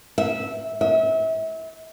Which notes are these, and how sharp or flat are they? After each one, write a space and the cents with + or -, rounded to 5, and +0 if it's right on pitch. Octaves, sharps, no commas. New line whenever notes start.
E5 -15
E5 -35